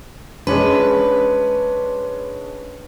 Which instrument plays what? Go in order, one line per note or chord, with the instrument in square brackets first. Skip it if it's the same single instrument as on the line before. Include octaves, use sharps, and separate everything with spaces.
[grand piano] G#3 C#4 D4 [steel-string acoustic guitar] B4